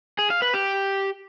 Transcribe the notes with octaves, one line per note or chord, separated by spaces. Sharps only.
G#4
F5
B4
G4